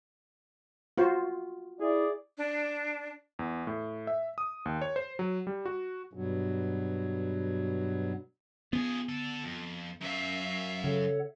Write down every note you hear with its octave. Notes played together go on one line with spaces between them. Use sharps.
F4 F#4 C5
E4 G#4 D5
D4
E2
A2
E5
D#6
D#2
C#5
C5
F#3
G3
F#4
G2 B2 F#3
F3 B3 G#4
D3 A4
F2
F#2 F#3 E5 F5
C#3 A4 C#5 F#5